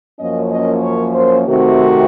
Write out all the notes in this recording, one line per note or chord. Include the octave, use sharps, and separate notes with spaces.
F#2 F3 A#3 C#4 D#5
D#5
C#5
C5
C3 D#3 A3 C4 F#4